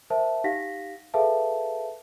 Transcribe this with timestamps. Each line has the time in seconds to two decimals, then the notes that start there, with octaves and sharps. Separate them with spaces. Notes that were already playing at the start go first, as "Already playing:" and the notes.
0.10 A#4 C5 E5 A5
0.44 D#4 G4 F5 F#5 A#6 B6
1.14 G#4 A4 B4 E5 F5 A5